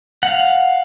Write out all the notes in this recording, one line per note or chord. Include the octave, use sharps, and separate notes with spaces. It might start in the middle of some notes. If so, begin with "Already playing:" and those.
F5 F#5